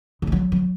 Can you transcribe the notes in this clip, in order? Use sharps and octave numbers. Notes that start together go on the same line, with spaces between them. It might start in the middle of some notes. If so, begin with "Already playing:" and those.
C#3
G3
F#3
F#3